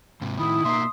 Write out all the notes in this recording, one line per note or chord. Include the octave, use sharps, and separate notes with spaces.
G#2 C3
A2 D#3 E4 D#6
B2 A#3 D#4 E5 C6